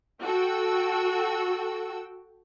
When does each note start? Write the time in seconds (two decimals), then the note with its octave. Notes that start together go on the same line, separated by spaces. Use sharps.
0.23 F#4 A4 G5 E6